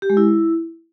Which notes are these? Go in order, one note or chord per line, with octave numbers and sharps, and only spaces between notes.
G4
G#3
E4